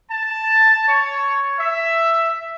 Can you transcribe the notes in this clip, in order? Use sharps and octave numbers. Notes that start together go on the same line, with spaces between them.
A5
C#5
E5